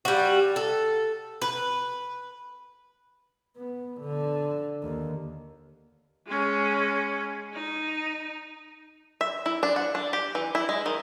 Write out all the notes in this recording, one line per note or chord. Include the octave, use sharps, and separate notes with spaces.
G3 F#4
A4
B4
B3
D3
D#2
G#3 C#4
D#4
E5
E4
D4
F#5
D4
G4
E3
E4
G#3
D#3